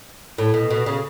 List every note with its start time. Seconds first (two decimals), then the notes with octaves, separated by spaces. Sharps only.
0.38 A2
0.54 B2
0.71 B2
0.86 C#3